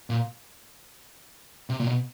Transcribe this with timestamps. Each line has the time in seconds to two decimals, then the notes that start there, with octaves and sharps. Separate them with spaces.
0.10 A#2
1.70 C3
1.80 A#2
1.87 B2